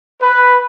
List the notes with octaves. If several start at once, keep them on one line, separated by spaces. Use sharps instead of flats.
B4